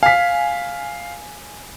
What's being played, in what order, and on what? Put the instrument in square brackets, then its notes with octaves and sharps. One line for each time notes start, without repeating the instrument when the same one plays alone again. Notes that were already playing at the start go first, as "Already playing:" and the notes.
[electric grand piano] F5 [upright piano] G#5 B6